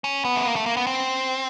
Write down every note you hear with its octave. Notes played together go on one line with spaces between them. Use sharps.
C#4
B3
A3
A#3
A3
A#3
B3
C4